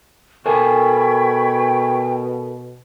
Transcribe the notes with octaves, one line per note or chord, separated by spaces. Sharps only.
B2 A4 A#4 G5 G#5 B5 C#6 G#6